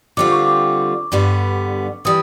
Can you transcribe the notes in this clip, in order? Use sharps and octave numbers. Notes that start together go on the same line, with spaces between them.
D3 G3 C4 F4 D6
C#6
D6
G2 D3 G3 B3
E3 G3 D#6